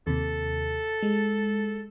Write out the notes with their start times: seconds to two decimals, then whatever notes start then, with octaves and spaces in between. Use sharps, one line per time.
0.07 D#2 C3 A4
1.03 G#3